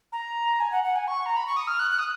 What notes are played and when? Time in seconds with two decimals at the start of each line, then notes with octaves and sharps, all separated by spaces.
0.12 A#5
0.60 G#5
0.72 F#5
0.84 F#5
0.96 G#5
1.07 C#6
1.26 A#5
1.37 B5
1.47 C#6
1.57 D#6
1.67 F6
1.79 F#6
1.91 F#6
1.99 D#6